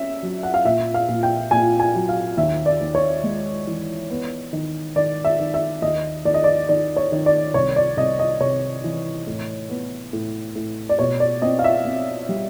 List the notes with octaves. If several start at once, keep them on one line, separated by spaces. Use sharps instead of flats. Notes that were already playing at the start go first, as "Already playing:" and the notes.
Already playing: C#4 E5
F#3
F#5
F5
A#2 E5
F5
A#2
G5
A#2 G#5
G#5
F#3
F5
D#2 E5
D5
D#2
C#5
G#3
E3
B3
D#3
D#3 D5
E5
D#3
E5
D#2 D#5
D#2 D5
D#5
D5
D#3 D5
C#5
D#3
D5
C2 C#5
D5
C2 D#5
D#5
C3 C#5
E3
A2
B3
A2
A2
D5
B2 C#5
D5
C4 D#5
F5
E5
C4
G3